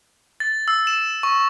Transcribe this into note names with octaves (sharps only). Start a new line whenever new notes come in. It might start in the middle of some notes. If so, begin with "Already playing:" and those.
A6
E6
E7
C#6